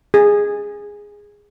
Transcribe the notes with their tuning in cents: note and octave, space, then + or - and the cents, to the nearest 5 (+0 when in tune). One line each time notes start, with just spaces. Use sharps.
G#4 -10